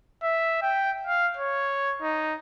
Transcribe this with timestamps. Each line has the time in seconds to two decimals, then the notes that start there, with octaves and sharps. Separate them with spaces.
0.23 E5
0.62 G5
1.07 F5
1.37 C#5
2.02 D#4